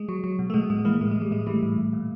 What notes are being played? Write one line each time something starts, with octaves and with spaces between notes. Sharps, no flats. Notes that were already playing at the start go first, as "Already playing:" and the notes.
Already playing: G#3
F#3
F#3
B2
A3
B2 G#3
A2 G#3
E3 G#3 A#3
A2 G#3
G#3
A2
G3
A2 G#3
E3 G3 A3
A2
A2
A#2